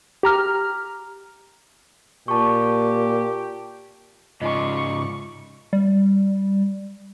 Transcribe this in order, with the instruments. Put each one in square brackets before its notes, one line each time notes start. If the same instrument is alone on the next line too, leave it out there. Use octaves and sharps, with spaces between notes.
[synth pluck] G4 A#5 F6
[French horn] A#2 [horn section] G4 [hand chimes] A5 C#6
[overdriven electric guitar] G#2 C#3 [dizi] F4 [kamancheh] D5 C#6 [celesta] D#5
[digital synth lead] G3